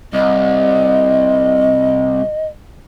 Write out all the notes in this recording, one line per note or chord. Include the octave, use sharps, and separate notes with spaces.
C2 D#5